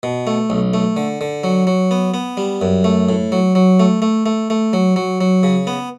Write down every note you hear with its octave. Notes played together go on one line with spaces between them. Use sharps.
B2
A3
B1
A3
D3
D3
F#3
F#3
B3
B3
G3
F#2
A3
A2
F#3
F#3
A3
A3
A3
A3
F#3
F#3
F#3
C#3
B3